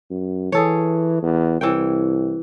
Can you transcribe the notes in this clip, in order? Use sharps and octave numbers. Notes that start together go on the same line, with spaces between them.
F#2
E3 G#4 A4 C#5
E2
C2 E3 C#5 G5